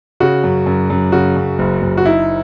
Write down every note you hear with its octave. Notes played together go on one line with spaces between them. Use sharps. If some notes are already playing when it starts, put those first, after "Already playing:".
C#3 F#4
F#2
F#2
F#2
C#3 F#4
F#2
F#1
F#1
F#4
D#4 E4